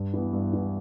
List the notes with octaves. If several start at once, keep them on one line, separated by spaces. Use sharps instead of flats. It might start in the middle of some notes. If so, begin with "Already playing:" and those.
Already playing: G2
E3 B3
G2
E3 B3